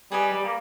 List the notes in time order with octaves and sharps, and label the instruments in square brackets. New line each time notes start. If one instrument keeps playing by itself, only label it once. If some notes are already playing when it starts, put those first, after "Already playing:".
[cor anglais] G3 [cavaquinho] G#4 B4 D#5 G#5
[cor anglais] G3
A#3